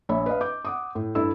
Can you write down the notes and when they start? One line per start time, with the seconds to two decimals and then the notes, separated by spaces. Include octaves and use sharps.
0.09 A#1 C#5 E5 B5
0.26 B4 D#5 F5
0.41 D6 G6
0.65 F#5 D6 D#6
0.95 A2
1.15 G2 E4 A4 E6